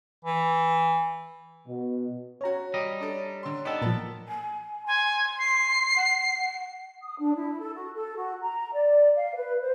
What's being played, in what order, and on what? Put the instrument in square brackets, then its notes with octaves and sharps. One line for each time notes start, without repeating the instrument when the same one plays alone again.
[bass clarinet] E3
[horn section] B2
[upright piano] C#4 F#4 [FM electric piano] C#5 A#5
[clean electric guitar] G3 D#5
[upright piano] D4 A4
D3 C6
[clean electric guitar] B3 A4 [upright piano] D#4 G4 D5
[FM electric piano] A#2 F3 [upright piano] A#4 A5
[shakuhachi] G#5
[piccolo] G#5 [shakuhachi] C6
[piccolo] C7
[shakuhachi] F#5
[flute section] D#6
D4
E4
A4
F#4
A4
F#4
A#5
D5
F5
B4
C5